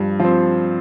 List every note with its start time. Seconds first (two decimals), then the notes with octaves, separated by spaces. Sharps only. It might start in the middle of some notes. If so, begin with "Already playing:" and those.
Already playing: G2 F3
0.20 F3 C4